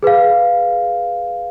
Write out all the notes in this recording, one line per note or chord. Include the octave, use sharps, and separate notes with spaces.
G#4 B4 F5